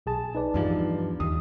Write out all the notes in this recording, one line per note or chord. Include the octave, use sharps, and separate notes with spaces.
B1 G#4 A5
D#4 B4 D5
E2 G2 F3
D#2 D#6